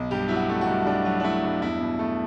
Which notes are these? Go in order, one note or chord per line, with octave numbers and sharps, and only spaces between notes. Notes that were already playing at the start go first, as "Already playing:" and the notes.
Already playing: B1
G2 G4
F#3 E4
F#4
A3
F#4
G2
G2 D4
F#3
D4
A3 E4
G2
E2 E4
B2
A3